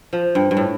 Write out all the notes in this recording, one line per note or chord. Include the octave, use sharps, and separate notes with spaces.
F3
G2
G2
A2